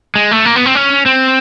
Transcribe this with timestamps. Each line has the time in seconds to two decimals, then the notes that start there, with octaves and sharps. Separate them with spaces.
0.16 G#3
0.31 A3
0.45 A#3
0.56 B3
0.66 C4
0.75 C#4
1.06 C4